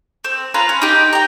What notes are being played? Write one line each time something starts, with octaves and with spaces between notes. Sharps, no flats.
C4
C#4 F4 B4 A#5
C#4
D#4 G4
G5 A#5